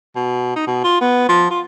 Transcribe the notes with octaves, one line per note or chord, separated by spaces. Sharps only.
B2
D#4
B2
F4
B3
F3
F4